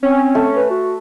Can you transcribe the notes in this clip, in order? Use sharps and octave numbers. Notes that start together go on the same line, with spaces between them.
C4 C#4
A3
B4
F#4